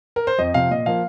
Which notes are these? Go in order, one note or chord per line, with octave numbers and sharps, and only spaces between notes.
A#4
C5
F2 D#5
C3 F3 F5
A#2 D#5
F3 A#3 F5